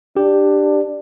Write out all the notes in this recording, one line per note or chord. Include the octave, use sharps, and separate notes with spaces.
D4 G4